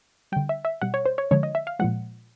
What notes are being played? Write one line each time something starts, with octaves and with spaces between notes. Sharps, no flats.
D3 G3 G5
E5
E5
B2 G3 F#5
C#5
C5
C#5
D3 F3 G#3 C#5
D#5
E5
F5
A#2 F3 G#3 F#5